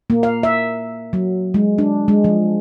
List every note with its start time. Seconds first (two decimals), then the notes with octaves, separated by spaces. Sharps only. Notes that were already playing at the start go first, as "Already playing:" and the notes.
0.10 A#3
0.23 F5
0.43 E5
1.13 F#3
1.54 G#3
1.78 D4
2.08 G#3
2.24 F3